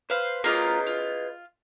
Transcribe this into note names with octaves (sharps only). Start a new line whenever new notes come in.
B4 C5 F5
A#3 F4 G#4 B4 D#5
F4